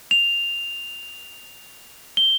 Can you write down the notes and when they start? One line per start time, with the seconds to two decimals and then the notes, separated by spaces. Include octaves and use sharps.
0.11 F7
2.17 G7